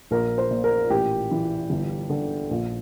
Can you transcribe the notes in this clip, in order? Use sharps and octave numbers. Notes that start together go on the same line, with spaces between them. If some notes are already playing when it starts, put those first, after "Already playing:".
A#1 A#4
C5
A#2
A#4
A1 G4
E3
G1
D3
A#1